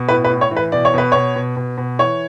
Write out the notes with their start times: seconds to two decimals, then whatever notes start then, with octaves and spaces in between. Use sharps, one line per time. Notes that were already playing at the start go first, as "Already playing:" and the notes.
Already playing: B2
0.09 A2 B4
0.25 B4
0.30 A2
0.41 C#5
0.51 E3
0.57 B4
0.72 B2 D5
0.85 C#5
0.94 B2 B4
1.12 B2 C#5
1.36 B2
1.57 B2
1.78 B2
1.99 E3 C#5